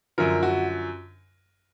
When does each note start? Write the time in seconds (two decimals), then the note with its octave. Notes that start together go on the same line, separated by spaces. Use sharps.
0.18 F#2 D3 F3 A#4
0.43 F#4